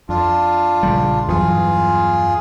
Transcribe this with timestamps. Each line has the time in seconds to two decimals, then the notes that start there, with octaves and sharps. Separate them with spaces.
0.09 F2 D4 F4
0.83 A#1 C#3 G3
1.28 E2 G2 F#3 F4 G#4